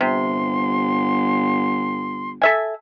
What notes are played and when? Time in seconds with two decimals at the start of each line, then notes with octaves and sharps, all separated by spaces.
0.01 G1 C3 C6
2.42 A4 E5 G#5